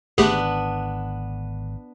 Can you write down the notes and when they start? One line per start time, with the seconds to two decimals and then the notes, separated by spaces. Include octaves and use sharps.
0.18 G#1 D3 A3 B3 D4 G4 G#4